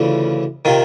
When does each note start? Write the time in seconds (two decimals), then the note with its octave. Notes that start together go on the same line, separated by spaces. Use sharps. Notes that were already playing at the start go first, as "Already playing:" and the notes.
Already playing: D2 C#3 E3 F4
0.65 C3 D#3 F4